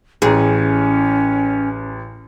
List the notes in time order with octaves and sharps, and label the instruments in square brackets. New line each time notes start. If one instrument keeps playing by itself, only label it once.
[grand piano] A1 A#5 [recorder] C#4 [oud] G#4